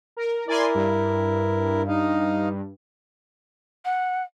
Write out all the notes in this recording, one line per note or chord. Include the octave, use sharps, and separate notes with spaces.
A#4
E4 A#4 D5 G#5 C6
G2
D#4 D#5 F5
F#5